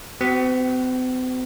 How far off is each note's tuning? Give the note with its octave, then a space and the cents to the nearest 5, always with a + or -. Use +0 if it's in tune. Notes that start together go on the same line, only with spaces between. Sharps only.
C4 -45 F#4 +25